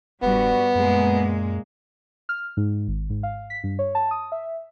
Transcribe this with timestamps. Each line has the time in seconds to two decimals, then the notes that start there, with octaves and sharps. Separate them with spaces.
0.22 E1 G2 G3 B3 F#4
0.75 F#2 A#2 G#3 A#3
2.29 F6
2.57 G#2
2.88 G#1
3.10 G#2
3.23 F5
3.50 B6
3.64 G2
3.79 C#5
3.95 A5
4.11 D#6
4.32 E5